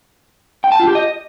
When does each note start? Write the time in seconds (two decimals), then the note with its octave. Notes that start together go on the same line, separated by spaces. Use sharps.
0.64 G5
0.72 A5
0.80 F4
0.87 G4
0.95 D#5